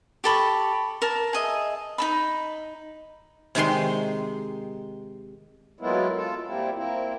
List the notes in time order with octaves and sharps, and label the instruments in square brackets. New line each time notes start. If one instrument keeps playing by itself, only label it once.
[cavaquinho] G4 A4 B5 C#6
A#4 A5
G#4 D#5 E5
D#4 A4 B5
[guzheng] C3 D#3 G#3 C6
[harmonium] F#3 G#3 A#3 B3 E4 F4
F4 A4
A#2 G3 A#3 C4 E4
A#3 C4 E4